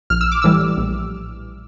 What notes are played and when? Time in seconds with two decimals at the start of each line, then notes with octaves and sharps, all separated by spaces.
0.10 A#1 F6
0.21 E6
0.32 D6
0.42 A2 E3 G3 E6
0.77 A#1